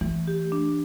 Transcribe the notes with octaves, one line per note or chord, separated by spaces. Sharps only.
E3 A3
G4
D4